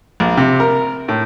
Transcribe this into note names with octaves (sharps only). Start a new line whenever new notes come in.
A#1
C3
A#4
A2